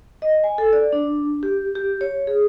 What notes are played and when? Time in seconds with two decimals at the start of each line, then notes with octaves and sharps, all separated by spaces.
0.22 D#5
0.44 G#5
0.58 A4
0.73 D5
0.92 D4
1.43 G4
1.75 G4
2.01 C#5
2.27 G#4